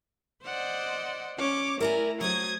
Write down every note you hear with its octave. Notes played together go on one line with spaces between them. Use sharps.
C5 D5 D#5 F#5
C#4 C#5 D6
A3 E4 A#4 D5 G#5 A#5
F#3 F#4 C5 D#6 G#6